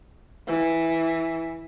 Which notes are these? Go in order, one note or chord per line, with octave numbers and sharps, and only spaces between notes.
E3